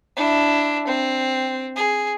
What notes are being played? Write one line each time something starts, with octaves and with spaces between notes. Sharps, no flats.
D4 E4
C4
G#4